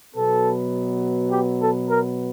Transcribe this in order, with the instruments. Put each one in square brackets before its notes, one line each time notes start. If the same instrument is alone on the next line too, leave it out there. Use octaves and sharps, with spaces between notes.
[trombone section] B2 F#3 B3 A4
G4
A4
A#4